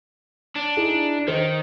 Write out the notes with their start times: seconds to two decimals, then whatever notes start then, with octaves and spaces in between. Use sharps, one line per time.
0.56 D4
0.77 D#4 E4 G#4
1.28 D#3 C5 D#5